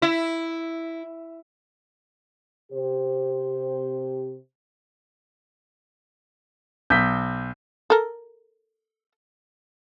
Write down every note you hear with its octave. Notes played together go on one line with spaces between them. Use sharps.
E4
C3 G4 C5
B1 G6 B6
A4 A#4